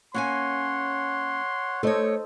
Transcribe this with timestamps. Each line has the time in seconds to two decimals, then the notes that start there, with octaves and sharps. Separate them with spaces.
0.14 A#3 C#4 C#5 F#5 G#5 C6
1.83 A3 A4 C5 C#5 D#5